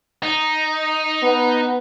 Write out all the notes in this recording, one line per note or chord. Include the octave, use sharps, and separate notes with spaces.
D#4
B3